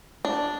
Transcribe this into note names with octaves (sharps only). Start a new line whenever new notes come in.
D4